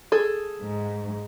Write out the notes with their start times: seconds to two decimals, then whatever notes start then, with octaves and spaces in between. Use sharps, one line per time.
0.12 G#4 A4
0.62 G#2